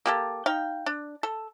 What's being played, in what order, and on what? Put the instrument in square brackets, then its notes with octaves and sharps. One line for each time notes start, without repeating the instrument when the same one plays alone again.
[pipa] A#3 G4 A4
D#4 F5 G5
D4
A4